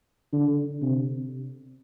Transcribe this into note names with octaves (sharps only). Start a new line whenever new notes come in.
D3
C3